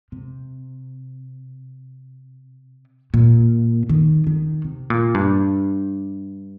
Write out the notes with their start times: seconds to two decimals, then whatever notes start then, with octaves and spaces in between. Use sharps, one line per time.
0.12 C3
3.14 A#2
3.89 D#3
4.27 D#3
4.64 C3
4.90 A#2
5.14 G2